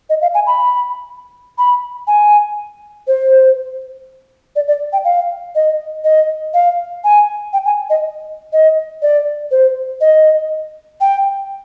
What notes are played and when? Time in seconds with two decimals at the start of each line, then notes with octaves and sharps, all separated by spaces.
0.10 D#5
0.22 F5
0.35 G#5
0.47 B5
1.58 B5
2.07 G#5
3.08 C5
4.56 D5
4.68 D5
4.93 G5
5.05 F5
5.55 D#5
6.04 D#5
6.54 F5
7.04 G#5
7.53 G5
7.66 G#5
7.90 D#5
8.53 D#5
9.02 D5
9.51 C5
10.01 D#5
11.01 G5